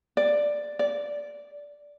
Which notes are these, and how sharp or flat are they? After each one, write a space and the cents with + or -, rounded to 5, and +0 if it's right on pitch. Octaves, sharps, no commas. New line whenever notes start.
D5 +5
D5 -10